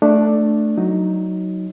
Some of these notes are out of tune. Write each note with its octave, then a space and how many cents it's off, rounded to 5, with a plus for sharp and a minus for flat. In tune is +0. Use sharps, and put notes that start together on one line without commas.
A3 +0 D4 +5
F#3 +0 D#4 +10